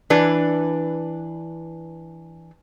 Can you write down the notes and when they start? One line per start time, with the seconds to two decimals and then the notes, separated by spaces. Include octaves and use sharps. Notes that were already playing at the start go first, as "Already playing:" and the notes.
0.10 E3 D4 B4